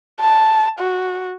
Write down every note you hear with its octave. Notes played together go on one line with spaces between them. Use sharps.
A5
F#4